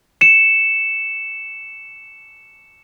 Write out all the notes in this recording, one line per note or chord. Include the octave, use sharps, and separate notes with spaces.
C#7 E7